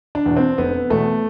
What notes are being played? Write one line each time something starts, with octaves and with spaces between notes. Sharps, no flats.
D4
E2 B2
C4
F1 B3
E2 B2 A3